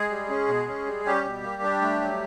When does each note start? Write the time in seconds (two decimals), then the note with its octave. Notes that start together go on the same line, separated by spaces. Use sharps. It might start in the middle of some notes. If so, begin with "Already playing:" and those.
Already playing: G#3 G#4
0.10 G3
0.30 C#4
0.48 B2
0.68 C#4
0.86 G3
1.05 G3 C#4 G4
1.24 B2
1.43 A#3
1.62 D4
1.82 A3
2.01 F#3